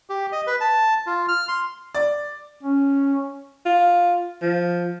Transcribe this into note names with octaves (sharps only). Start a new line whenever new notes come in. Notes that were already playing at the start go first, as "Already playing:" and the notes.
G4
D#5
B4
A5
F4
F6
C6
D5
C#4
F4
F3